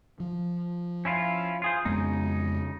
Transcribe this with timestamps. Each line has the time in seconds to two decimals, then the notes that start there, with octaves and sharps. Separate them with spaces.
0.20 F3
1.05 C#4 E4 F4
1.62 F4 G#4 C5
1.85 F2 C#3 G#3 B3 D#4